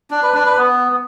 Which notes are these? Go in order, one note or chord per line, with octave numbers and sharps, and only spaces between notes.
D4
B4
D4
B4
B3